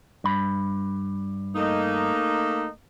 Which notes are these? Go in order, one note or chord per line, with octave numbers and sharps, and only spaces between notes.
G2 B5
A3 A#3 D#4